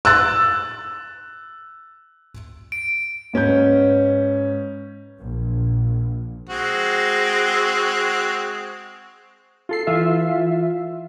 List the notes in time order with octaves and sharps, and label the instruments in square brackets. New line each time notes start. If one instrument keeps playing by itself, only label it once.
[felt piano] E6 F#6 A6
[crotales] D7
[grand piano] G#2 C#4 B4 G6
[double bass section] A#1
[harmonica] G#3 C4 F#4
[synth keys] F4 A4 C7
E3 F4 E5